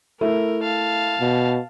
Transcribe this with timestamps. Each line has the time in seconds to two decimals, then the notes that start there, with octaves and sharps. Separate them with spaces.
0.21 A3 E4 A#4
0.63 F5 A5
1.21 B2